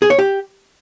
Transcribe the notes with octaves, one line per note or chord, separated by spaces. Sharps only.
G#4
C#5
G4